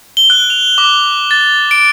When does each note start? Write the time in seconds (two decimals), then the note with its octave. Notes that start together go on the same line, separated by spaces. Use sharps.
0.17 G7
0.30 F#6
0.50 F7
0.78 D6
1.31 A6
1.71 D7